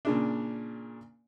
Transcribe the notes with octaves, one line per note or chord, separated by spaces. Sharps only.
A#2 C#3 D4